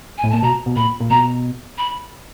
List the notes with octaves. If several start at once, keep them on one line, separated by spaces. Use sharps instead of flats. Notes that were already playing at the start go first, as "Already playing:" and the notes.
G#5
A2
A#2 A5
B2 A#5
B2
A#2 B5
A#2
B2 A#5
B5